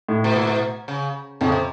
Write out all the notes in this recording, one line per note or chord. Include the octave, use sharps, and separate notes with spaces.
A2
B2
A#2
B2
C#3
F2 C#3
C3